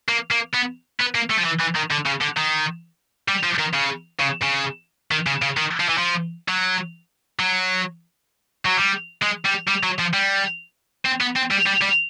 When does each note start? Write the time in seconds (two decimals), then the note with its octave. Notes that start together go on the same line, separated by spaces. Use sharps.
0.09 A#3
0.31 A#3
0.54 B3
1.00 B3
1.15 A#3
1.30 A3
1.39 F3
1.45 E3
1.61 E3
1.76 D#3
1.91 D3
2.06 C#3
2.21 D3
2.37 D#3
3.28 G3
3.44 F3
3.59 D#3
3.74 C#3
4.19 C#3
4.42 C#3
5.11 D#3
5.26 C#3
5.42 C#3
5.57 D#3
5.80 F3
5.89 E3
5.98 F3
6.49 F#3
7.40 F#3
8.65 F#3
8.77 G3
9.23 G#3
9.46 G3
9.68 G3
9.83 F#3
9.99 F3
10.14 G3
11.05 C4
11.21 B3
11.36 C4
11.51 G3
11.66 G3
11.82 G3